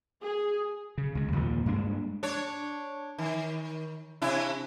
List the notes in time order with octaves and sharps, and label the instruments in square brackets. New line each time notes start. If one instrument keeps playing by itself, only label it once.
[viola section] G#4
[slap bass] C#3
C#2 C#3
D#2 A#2 D3 F3
G2 G#3 A#3 D4
[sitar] D4 C#5
D#3
C3 D4 E4